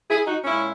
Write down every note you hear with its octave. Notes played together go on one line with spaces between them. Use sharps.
E4 G#4
D#4 F#4
A#2 G#3 C#4 E4